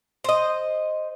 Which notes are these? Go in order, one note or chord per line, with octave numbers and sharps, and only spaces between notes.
C5 D#5